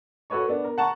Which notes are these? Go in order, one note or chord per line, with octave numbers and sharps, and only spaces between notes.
F#4 A4 B4 C#5 C#6
B3 D4
A#4
F#5 A5 A#5 C#6